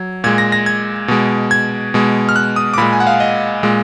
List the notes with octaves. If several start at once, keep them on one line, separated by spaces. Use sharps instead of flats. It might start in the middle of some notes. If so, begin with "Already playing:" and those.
Already playing: F#3 G#6
A#2 G#3 G#6
A#6
A#6
G#6
B2 G#3
G#6
B2 G#3
F6
F#6
D#6
D6
A#2 G#3 B5
G#5
F#5
F5
D#5
A#2 G#3